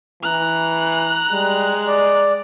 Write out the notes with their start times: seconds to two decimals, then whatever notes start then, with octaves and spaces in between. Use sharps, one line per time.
0.23 E3 A#5 F#6
1.31 G3 G#3
1.87 D5